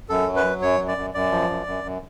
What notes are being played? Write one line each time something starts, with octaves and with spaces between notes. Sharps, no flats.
F#2 A4
F#3
B4
F#3
F#2 C#5
F#2
D5
F#2
F#2 D5
F3
F#2
F#2
F#2